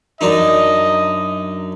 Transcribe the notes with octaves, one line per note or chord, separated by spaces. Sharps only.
F#2 D4 D#4 D#5